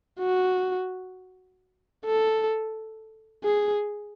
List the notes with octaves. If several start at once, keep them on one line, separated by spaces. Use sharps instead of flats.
F#4
A4
G#4